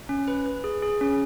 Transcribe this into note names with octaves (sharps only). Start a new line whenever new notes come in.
C#4
B4
B4
G#4
G#4
C#4